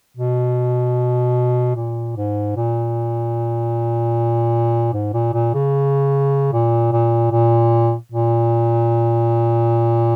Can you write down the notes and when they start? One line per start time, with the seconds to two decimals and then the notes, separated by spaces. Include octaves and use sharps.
0.17 B2
1.75 A#2
2.16 G#2
2.56 A#2
4.93 G#2
5.13 A#2
5.33 A#2
5.54 C#3
6.53 A#2
6.92 A#2
7.31 A#2
8.12 A#2